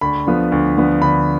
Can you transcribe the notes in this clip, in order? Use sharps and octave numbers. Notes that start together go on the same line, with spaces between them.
D2 B5
D3 F3 B3
D2
D3 F3 B3
D2 B5